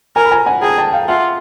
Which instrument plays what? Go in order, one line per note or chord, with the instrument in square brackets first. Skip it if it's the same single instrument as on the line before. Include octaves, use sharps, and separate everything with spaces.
[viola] A#4 [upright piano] G#5 A#5
[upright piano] B5
G#5 A#5
F#5 G#5
[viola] G#4 [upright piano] G5 A5
[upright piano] G5 A5
F5 G5
[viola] F4 [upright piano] E5 F#5